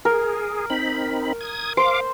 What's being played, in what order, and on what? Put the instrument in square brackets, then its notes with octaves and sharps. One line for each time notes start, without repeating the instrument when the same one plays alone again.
[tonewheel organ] G#4 [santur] A#4
[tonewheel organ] C4 D#4 B5
D#6 G#6
[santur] C5 [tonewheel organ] F5 D6